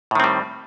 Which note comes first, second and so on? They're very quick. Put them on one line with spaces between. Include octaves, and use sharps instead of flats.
A2 D#3 C4 G3